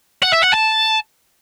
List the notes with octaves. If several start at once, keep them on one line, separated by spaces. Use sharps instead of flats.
F#5
E5
F#5
A5